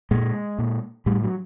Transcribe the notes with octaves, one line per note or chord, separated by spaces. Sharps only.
A#2 G#3
A#2
A2 G3
F#3